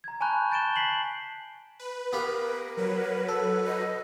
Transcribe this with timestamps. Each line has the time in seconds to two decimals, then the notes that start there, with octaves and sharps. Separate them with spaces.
0.04 A#5 G#6
0.21 G#5 A5 B5 C#6 F#6 G6
0.51 G6 A6 D7 E7 G7
0.76 B6 C7 F#7
1.80 B4
2.13 B3 G4 A#4 F5
2.77 F#3 B4
3.29 A4
3.67 D#5